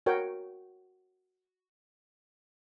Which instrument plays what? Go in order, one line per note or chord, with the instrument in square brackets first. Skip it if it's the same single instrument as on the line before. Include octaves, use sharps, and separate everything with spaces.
[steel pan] F#4 A#4 C#5 G5